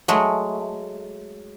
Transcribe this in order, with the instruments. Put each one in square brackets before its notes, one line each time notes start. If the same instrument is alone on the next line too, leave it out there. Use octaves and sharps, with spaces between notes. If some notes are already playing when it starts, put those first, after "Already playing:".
[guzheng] F#3 G#3 A3